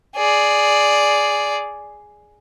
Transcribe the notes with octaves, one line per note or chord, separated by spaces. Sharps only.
G#4 D5